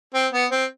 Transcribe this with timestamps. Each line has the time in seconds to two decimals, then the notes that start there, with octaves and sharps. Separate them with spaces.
0.14 C4
0.33 B3
0.52 C4